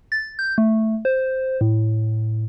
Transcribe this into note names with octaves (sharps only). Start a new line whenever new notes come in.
A6
G6
A3
C5
A2